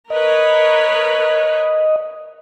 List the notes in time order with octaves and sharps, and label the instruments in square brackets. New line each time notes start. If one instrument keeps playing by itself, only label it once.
[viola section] A#4 B4 C#5 [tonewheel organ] D#5